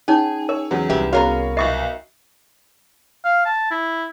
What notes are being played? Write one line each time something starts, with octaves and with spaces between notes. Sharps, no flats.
C#4 D#4 G#4 C#5
A#4 C#5
E2 C#3 F#3
C2 G4 B4 E5
B3 C#4 F#4 G#4 A#4 C#5 F5
B1 D#5 E5 C#6 C7
F5
A5
E4